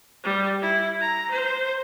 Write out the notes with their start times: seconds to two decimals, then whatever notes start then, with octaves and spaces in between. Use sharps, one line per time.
0.24 G3
0.62 E4
1.01 A#5
1.31 C5